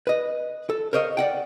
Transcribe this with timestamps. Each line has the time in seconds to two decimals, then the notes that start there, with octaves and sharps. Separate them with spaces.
0.07 B4 D#5
0.70 A4
0.93 A#4 C5 C#5 D#5 F5
1.17 D5 D#5 F#5 G5